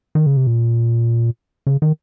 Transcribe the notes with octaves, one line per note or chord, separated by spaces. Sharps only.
D#3
C#3
C3
A#2
C#3
D#3